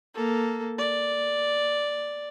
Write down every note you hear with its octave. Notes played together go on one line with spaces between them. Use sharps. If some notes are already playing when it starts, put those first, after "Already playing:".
A#3 A4
D5